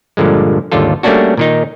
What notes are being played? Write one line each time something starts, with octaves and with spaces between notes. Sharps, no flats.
G2 A#2 D3 F3 G#3
G#1 D#2 D3 G3 F4 A4
G3 A3 A#3 C#4 D4 F#4
A#2 D#3 D#4